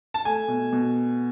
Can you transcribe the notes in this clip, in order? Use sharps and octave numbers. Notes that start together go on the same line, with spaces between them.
A5
A3 G#5
B2
B2